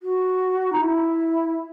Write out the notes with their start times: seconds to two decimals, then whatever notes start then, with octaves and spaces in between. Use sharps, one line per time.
0.02 F#4
0.72 D#4
0.81 E4